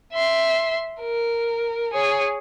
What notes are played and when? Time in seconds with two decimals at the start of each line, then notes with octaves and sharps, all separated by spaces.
0.13 E5 C6
1.01 A#4
1.93 G#4 C#5